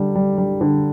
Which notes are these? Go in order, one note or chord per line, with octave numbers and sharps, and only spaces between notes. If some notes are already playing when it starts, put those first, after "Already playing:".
Already playing: D3 G3
G3
G3
D3